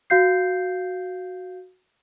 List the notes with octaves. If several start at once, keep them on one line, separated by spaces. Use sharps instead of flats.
F#4 F5 G6 C7